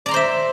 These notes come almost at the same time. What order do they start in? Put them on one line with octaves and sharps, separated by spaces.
D5 A#5 C6 C5 E5